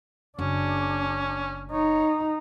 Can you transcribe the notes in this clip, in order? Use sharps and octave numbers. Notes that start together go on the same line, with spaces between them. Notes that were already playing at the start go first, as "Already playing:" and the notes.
F#1 C#4 D4
D#4 C#5